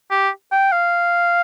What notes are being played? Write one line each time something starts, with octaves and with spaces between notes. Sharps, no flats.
G4
G5
F5